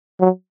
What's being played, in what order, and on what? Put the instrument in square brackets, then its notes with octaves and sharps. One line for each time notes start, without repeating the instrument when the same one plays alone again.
[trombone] F#3